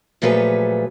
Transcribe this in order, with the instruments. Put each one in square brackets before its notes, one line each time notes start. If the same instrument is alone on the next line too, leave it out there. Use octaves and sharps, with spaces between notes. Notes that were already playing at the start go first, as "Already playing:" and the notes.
[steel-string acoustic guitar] A#2 F3 F#3 A3 G#4 B4